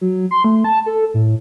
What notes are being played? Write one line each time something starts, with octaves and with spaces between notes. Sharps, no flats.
F#3
C6
A3
A5
A4
A2